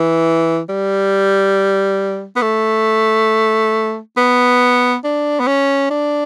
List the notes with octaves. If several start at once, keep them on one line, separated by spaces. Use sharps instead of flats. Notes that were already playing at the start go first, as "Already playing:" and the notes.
Already playing: E3
G3
B3
A3
B3
D4
B3
C#4
D4